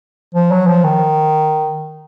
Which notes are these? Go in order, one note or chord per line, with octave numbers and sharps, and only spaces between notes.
F3
F#3
F3
D#3